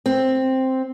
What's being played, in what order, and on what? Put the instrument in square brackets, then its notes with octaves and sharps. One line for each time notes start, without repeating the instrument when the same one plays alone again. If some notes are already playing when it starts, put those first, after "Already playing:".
[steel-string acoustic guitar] C4